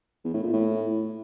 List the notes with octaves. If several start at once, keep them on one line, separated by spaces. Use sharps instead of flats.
E2
A2
A#2
A2